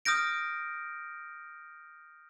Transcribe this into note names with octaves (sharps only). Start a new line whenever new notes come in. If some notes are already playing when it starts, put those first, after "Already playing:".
D#6 F6 G6 A#6 D7